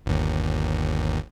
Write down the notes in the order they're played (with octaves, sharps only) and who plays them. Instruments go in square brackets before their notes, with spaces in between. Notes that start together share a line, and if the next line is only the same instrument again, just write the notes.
[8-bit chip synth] G1 D#2